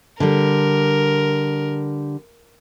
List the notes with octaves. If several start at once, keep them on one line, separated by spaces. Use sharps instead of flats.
D3 G3 A#4